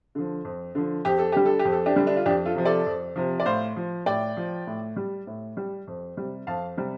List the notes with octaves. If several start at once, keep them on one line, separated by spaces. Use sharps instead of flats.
D3 F3
F2
D3 F3
F2 G4
A4
D3 G3 G4
A4
G4
F2
A4
D4 G4
D3 G3
D4
F4
F2 D4 G4
F4 A4
C3 F3
A4 D5
F2
C3 F3
D5
A2 C5 F5
F3
A2 D5 G5
F3
A2
G3
A2
G3
F2
C3 G3
F2 F5 A5
C3 G3